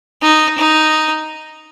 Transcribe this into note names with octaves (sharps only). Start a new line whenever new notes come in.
D#4
D#4